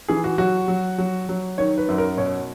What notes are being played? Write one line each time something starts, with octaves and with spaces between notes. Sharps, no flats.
E3 G#4
F#4
F#3 F#4
F#3
F#3
F#3
D#3 C#5
B4
F#2
A#4
B2 C#5